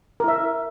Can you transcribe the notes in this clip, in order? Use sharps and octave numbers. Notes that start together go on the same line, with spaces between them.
E4 A#4 E5